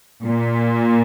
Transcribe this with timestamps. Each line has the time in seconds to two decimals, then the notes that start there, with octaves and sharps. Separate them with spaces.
0.23 A#2